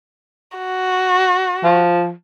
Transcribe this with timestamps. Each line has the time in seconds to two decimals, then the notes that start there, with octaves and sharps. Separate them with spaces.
0.57 F#4
1.63 F3